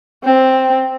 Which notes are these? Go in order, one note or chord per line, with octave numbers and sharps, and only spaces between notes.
C4